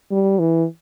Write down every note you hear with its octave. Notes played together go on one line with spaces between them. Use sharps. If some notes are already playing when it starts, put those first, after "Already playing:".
G3
E3